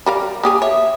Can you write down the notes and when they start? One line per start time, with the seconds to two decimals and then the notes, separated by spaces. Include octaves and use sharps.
0.06 G3 A#4 F5
0.43 A#3 G4 G#4 D#6
0.62 C#5 E5